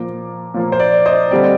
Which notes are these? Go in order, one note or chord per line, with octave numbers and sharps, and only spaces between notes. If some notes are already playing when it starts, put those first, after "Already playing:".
Already playing: A#2 F3 A#3 A#5 D6
A#2 F3 A#3
C5
D5
C5 D#5
D3 G3 C4 D5